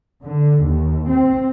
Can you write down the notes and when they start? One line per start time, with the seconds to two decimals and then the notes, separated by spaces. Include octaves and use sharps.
0.23 D3
0.62 D#2
1.09 C4